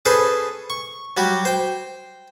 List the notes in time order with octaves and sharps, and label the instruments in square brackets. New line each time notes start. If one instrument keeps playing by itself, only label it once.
[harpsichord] C#4 G#4 A4 B4 C5
C#6
F#3 G3 F#4 G4
C5 G5